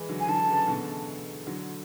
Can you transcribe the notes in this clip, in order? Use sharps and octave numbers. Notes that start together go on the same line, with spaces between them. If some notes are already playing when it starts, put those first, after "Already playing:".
Already playing: E3 G#3
D3 F#3
G#5
D3 F#3 A5
C#3 E3
B2 D3
D3 F#3